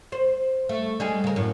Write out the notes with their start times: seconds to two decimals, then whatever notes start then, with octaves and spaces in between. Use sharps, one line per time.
0.12 C5
0.69 A3
1.00 G3 G#3 G#4
1.24 C#3 A#4
1.36 F#2 A2